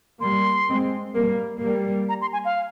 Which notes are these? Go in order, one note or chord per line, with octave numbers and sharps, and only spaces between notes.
G3 A#3 C6
G#3 C4
G3 A#3
G3 A#3
A#5
C6
G#5
F5